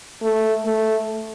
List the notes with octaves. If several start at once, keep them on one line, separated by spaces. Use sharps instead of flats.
A3
A3